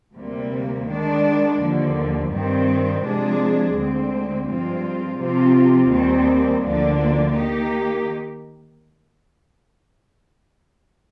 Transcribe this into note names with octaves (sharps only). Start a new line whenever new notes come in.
D2 C3 G3 A#3
D#3 G#3 D4
D#2 D3 F3
G2 D#3 G3 C4
C3 F3 G#3 D4 G#4
D2 D3 G#3 C4
G2 F3 G#3 C4 F4
C3 F3 C4 F4
D#2 D#3 G3 C4
D2 D3 F3 A#3 D4
D#3 A#3 D#4 G4